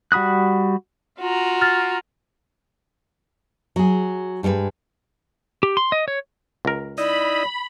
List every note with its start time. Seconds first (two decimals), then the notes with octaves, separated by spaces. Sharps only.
0.12 G3 F#4 B5 D#6 F#6
1.19 F4 F#4 A#5
1.61 F6 A6
3.76 F#3 G#4
4.43 G2 G3 G#3 A4 B4
5.63 G4
5.77 C6
5.92 D#5
6.08 C#5
6.65 C#2 A#4
6.98 D#4 E4 D5 D#5 B5